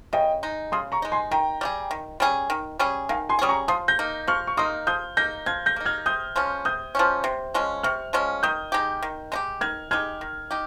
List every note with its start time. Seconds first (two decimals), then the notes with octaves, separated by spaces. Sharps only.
0.13 C#3 D#5 G5
0.43 G#3 D#4
0.72 C#3 C6 D#6
0.92 A#5 C#6
1.02 G#3 D#4
1.12 G#5 C6
1.31 D#3 G5 A#5
1.61 G3 C#4 G#4
1.91 D#3
2.20 G3 C#4 G#4
2.50 D#3
2.79 G3 C#4 G#4
3.09 D#3 F5 G#5
3.29 G#5 C6
3.39 G3 C#4 G#4 D#6
3.49 A#5 C#6
3.68 F3 C6 D#6
3.88 G6 A#6
3.99 A#3 D#4
4.27 F3 C#6 F6
4.47 C#6
4.57 A#3 D#4 C6 D#6
4.87 F3 D#6 G6
5.17 A#3 D#4 G6 A#6
5.46 F3 F6 G#6
5.66 G6 A#6
5.76 A#3 D#4
5.85 F6 G#6
6.06 C3 D#6 G6
6.36 F3 G#3 C#4
6.65 C3 D#6 G6
6.95 F3 G#3 C#4
7.24 C3
7.54 F3 G#3 C#4
7.83 C3 C#6 F6
8.13 F3 G#3 C#4
8.43 D#3 D#6 G6
8.72 G#3 D#4 G4
9.02 D#3
9.32 G#3 D#4 G4
9.61 D#3 F6 G#6
9.91 G#3 D#4 G4 F6 G#6
10.21 D#3
10.51 D#4 G4